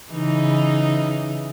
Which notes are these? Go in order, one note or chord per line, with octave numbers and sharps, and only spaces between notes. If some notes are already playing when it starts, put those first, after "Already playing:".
C#3 E3 D#4